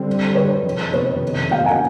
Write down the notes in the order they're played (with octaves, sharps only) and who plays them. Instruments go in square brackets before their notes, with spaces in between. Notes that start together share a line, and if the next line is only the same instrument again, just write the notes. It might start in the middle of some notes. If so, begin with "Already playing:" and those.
Already playing: [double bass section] D3 G3 C4
[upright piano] B4 C#5
[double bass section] F2 C3 D#3
[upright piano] B4 C#5
F5 G5
F#5 G#5